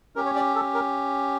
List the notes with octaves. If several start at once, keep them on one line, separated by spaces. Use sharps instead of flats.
C#4 G4 A#4
C#5
D5
A4
A#4